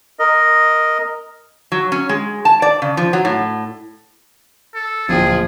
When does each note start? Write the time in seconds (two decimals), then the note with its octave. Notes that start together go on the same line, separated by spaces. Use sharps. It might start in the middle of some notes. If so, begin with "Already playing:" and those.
0.19 A#4 D#5
1.72 F#3
1.92 C#4
2.09 G#3
2.45 A5
2.62 D5
2.82 C#3
2.97 F3
3.13 F#3
3.25 A2
4.75 A4
5.09 D1 A#2 F3 G#4 G5